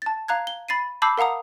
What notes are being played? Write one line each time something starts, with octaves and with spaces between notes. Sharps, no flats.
A5 A6
F5 A#5 F#6 G#6
G7
B5 A6 C7 D#7
A5 B5 D6 E6 G6 C7
A#4 F5 F#5 A#5 D#6